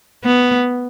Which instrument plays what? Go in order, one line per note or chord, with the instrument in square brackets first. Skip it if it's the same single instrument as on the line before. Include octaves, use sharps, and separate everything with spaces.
[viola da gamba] B3